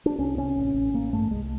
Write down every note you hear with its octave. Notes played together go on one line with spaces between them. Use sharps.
D4
C2 C#4
C3 C#4
A1
A1
A1 A#3
G2 A3
C2 G#3